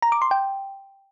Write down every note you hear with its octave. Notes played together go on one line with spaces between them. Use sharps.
A#5
D6
C6
G5